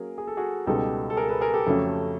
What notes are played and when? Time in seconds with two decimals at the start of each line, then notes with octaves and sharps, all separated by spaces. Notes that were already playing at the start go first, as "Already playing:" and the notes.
Already playing: F#3 A#3 C#4 G#4 A#4
0.18 G#4
0.27 A4
0.37 F#4 G#4
0.66 C#2 B2 G3 B3 D#4 G4 A4
1.10 A4
1.17 G#4 A#4
1.29 A4 B4
1.41 G#4 A#4
1.53 G4 A4
1.66 F2 C#3 F#3 A3 C#4